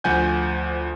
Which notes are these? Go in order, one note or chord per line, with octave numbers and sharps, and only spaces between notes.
D2 F3 F#5 G#5 G6